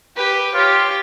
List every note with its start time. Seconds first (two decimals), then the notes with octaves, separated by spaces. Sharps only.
0.16 G4 B4
0.54 F4 G4 C#5